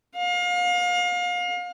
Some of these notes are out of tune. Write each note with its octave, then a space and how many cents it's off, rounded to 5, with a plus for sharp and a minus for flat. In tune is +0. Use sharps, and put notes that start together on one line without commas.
F5 +35